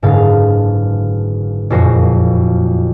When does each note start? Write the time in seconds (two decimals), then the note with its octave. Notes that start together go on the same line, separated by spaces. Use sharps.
0.02 F#1 G#2 B2 D3 A4 F5
1.70 F#1 F2 A#2 F#4 C5 A#6